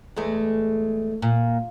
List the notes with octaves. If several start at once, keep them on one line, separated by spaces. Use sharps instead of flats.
E2 G#3 A3
A#2